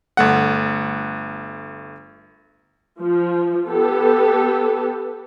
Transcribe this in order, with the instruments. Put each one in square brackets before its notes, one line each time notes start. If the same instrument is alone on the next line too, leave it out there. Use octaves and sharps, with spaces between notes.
[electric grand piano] G1 A3 F#5
[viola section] F3
B3 G4 A4